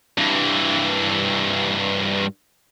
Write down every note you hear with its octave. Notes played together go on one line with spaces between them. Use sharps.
G2 E3